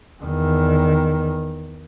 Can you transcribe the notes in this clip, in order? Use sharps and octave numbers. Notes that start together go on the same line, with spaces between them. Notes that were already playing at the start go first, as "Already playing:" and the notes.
E2 D#3